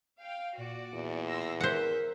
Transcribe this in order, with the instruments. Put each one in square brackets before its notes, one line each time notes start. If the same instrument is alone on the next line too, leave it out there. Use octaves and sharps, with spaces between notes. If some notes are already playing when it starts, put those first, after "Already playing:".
[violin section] F5 G5
[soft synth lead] A#2 [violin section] F#4 D5
[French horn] E2 [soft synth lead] A#2
[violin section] C6 E6 A#6
[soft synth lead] A#4 [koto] C5 F#5 [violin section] E5